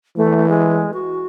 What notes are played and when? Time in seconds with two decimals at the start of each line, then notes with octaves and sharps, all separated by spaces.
0.16 E3 A3
0.49 G#3
0.93 F#4